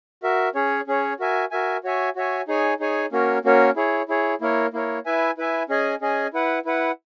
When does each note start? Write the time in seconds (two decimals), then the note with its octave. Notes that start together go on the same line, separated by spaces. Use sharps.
0.23 F#4 A#4 E5
0.55 C#4 G#4 C#5
0.87 C#4 G#4 C#5
1.19 F#4 A#4 E5 G#5
1.51 F#4 A#4 E5 G#5
1.84 F#4 C#5 E5 G#5
2.16 F#4 C#5 E5 G#5
2.48 D#4 G#4 C#5 G#5
2.80 D#4 G#4 C#5 G#5
3.12 A#3 C#4 F#4 A#4 C#5
3.45 A#3 C#4 F#4 A#4 C#5
3.76 E4 G#4 C#5
4.09 E4 G#4 C#5
4.41 A#3 E4 A#4 C#5
4.73 A#3 E4 A#4 C#5
5.06 E4 B4 E5 G#5
5.38 E4 B4 E5 G#5
5.69 C#4 G#4 D#5 G#5
6.01 C#4 G#4 D#5 G#5
6.33 E4 B4 F#5
6.65 E4 B4 F#5